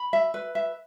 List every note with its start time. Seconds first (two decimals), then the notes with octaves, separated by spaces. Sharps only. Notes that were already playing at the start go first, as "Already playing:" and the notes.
Already playing: B5
0.13 E5
0.34 B4
0.55 E5